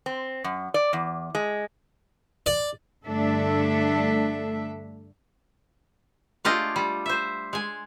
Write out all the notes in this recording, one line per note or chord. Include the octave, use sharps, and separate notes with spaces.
C4
F#2
D5
E2
G#3
D5
G2 D3 A3 D4 A4 E5
A3 D4 F4 G4 G#4 D#5
G3
C5 E5
G#3 G#5